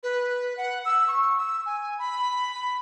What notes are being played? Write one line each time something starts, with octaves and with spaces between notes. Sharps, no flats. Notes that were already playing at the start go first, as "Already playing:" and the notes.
B4
F#5
E6
C#6
E6
G#5
B5